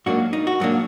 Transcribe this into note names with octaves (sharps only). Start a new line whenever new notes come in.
G#2 F#3 A#3 D4 F#4
D#4
F#4
G#2 F#3 A#3 D4